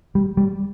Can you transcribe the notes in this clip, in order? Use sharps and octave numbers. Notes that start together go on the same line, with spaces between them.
G3
G3